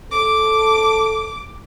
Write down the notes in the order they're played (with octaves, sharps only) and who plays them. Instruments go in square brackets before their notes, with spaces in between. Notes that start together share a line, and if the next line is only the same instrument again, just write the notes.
[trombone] A4 [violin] D6